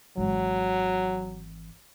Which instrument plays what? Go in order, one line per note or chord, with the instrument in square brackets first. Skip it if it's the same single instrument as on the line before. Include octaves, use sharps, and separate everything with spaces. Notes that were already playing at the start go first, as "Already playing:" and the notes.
[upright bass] G#1 E3 [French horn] F#3